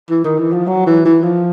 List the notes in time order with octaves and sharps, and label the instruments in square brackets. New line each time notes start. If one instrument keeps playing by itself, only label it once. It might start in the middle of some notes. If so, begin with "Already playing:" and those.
[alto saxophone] E3
D#3
E3
F3
F#3
E3
E3
F3